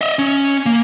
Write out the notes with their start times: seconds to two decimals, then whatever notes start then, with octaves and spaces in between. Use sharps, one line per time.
0.01 D#5 E5
0.19 C#4
0.66 A#3